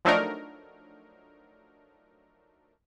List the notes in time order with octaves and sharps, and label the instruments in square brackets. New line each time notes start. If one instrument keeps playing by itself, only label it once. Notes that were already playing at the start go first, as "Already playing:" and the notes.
[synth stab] F3 F#3 A3 D4 D#4 A#4